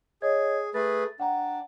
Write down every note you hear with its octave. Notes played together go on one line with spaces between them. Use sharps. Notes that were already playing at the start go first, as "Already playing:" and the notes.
G#4 C#5 D#5 G#6
A3 G#4 B4 A6
D4 F#5 G5 A#5